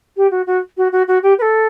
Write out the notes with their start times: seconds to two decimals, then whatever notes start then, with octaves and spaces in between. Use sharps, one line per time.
0.16 G4
0.31 F#4
0.46 F#4
0.77 F#4
0.92 F#4
1.07 F#4
1.22 G4
1.38 B4
1.41 A4